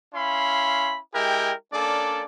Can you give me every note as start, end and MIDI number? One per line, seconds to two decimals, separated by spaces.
0.14 0.99 61
0.14 0.99 64
0.14 0.99 77
0.14 0.99 83
0.14 0.99 84
1.14 1.52 56
1.14 1.52 64
1.14 1.52 67
1.14 1.52 70
1.14 1.52 79
1.73 2.25 58
1.73 2.25 61
1.73 2.25 62
1.73 2.25 69
1.73 2.25 74